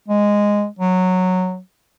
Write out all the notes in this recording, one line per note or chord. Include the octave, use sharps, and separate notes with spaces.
G#3
F#3